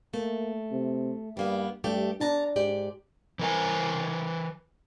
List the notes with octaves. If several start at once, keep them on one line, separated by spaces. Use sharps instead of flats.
A3 A#3
C3
G2 G3 A#3 B3
G2 A3 G4
E2 D4 A5 A#5
G#2 G4 D5
E3 A#4 G#5